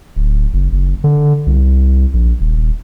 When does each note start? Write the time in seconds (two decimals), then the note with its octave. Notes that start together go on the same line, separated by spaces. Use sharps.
0.16 D1
0.54 F#1
0.73 F#1
1.04 D3
1.47 C2
2.14 A#1
2.41 D#1